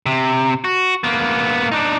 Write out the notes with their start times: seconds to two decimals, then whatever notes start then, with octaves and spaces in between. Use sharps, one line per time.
0.06 C3
0.64 F#4
1.04 A#3 B3
1.72 D4 D#4